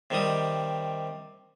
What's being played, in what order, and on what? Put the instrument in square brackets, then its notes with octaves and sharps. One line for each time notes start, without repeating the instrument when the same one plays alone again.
[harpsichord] C3 D#3 G3 D#6